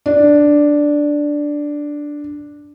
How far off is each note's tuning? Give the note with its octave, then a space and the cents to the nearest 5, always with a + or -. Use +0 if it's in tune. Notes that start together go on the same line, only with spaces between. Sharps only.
D4 +0